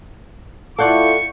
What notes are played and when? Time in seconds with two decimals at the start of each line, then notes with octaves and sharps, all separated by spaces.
0.79 E4 F4 A4 D5 F#5 C#6 G6